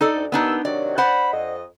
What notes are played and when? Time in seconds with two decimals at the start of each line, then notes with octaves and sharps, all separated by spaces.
0.01 D#4 A4 D5
0.15 D2
0.32 D#2 B3 D4 D#4 E6
0.65 C3 D#3 F#3 D5
0.98 C5 D5 F#5 B5
1.32 F2 D#5